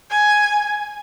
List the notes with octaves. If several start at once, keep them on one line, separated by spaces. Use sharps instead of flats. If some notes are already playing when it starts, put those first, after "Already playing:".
G#5